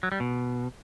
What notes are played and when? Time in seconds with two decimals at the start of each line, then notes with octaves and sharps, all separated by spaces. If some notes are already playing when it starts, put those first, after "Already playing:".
0.03 F#3
0.12 G3
0.20 B2